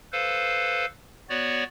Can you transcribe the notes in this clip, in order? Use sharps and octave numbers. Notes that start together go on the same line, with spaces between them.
A4 B4 C5 F5
B3 F#4 C#5 D5